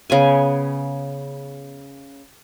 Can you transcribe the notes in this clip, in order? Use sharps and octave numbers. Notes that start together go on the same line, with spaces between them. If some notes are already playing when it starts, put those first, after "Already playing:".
C#3 B3 G#5